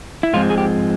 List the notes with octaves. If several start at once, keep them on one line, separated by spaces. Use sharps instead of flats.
E4
G#2 F3 G#3 C4 F4
G#4
G4